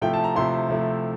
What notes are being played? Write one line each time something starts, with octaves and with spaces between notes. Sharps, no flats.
C3 F3 A3 E4 G5
A5
A#5
C3 F3 A3 E4 C6
C3 F3 A3 E4